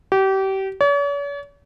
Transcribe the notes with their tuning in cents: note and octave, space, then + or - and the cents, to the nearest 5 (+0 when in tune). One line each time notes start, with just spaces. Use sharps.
G4 -30
C#5 +45